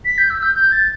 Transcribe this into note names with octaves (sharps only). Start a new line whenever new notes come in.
B6
G6
E6
G6
G6
A6